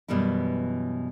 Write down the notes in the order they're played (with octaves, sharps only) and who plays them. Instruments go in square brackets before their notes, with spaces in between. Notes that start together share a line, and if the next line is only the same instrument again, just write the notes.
[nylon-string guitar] F#2 B2 E3 G3 B3 E4